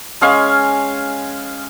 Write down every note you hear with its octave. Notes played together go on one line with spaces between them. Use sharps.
G#3 C#4 F5 G#5